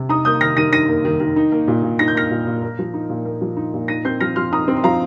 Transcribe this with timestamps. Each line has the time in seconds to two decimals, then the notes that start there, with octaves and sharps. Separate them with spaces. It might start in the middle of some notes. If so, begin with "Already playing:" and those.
Already playing: C3
0.09 D#4 A#5 D#6
0.25 A#3 D#6 G6
0.41 D#3 F6 A#6
0.57 D#3 A#6 D#7
0.73 D#4 A#6 D#7
0.89 A#3
1.05 D#3
1.20 D#3
1.36 D#4
1.52 A#3
1.68 A#2
1.83 A#2
1.99 D#4 A#6
2.08 G6
2.15 A#3 F6 A#6
2.30 A#2
2.47 A#2
2.62 A#3
2.79 F3
2.94 D#4
3.09 A#2
3.25 A#3
3.42 F3
3.57 D#4
3.74 A#2
3.88 D#4 A#6 D#7
4.05 C4 G6 C7
4.20 F3 F6 A#6
4.36 F3 C6 F6
4.52 D#4 A#5 D#6
4.68 C4
4.77 C6
4.84 F3 F5 A#5